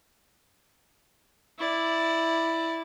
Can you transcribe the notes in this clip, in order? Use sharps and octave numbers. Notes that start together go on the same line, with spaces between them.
E4 D5